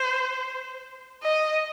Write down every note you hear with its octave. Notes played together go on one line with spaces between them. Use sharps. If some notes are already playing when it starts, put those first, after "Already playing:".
Already playing: C5
D#5